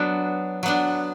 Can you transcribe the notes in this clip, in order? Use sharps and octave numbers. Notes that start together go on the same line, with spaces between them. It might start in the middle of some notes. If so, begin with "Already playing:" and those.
Already playing: F#3 B3 D4
F#3 B3 D4